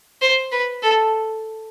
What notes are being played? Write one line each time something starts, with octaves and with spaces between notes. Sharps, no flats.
C5
B4
A4